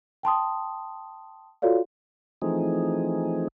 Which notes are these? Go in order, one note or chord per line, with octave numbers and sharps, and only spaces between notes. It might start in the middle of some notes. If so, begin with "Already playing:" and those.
G5 A5 C6 D#6
F4 F#4 A4 C#5 D5 F5
E3 F3 A3 C4 D#4 G#4